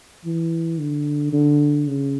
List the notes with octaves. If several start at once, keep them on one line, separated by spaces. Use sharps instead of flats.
E3
D3
D3
C#3